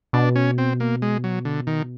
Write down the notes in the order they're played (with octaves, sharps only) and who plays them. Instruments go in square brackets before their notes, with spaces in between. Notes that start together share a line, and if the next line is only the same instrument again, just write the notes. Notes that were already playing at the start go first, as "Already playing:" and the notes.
[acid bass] B2 [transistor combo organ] D4
[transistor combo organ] C#4
C4
A#3
G#3
F#3
D3
D#3